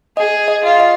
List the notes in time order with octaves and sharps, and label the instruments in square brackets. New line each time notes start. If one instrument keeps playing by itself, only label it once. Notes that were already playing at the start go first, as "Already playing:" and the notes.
[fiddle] G#4 [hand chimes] D#5
[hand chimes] D#5
[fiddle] F4
[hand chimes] D#5